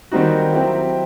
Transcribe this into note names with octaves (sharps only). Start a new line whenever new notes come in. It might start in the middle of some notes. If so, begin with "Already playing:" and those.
D#3 G3 C4 D#4 F#4
F#3 C4 E4 G4